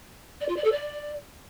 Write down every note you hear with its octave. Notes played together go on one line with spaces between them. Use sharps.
D5
F4
D5
A4
D5